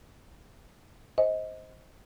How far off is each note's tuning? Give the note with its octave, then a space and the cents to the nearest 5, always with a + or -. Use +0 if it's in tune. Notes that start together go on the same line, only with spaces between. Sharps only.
C5 +0 D#5 +20